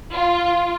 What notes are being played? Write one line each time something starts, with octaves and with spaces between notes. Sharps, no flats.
F4